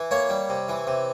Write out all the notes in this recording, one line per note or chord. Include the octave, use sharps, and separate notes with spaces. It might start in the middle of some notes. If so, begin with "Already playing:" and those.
Already playing: E3
A#3 C#5
G3
C3
E3
C3